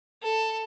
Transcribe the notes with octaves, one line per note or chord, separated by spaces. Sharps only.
A4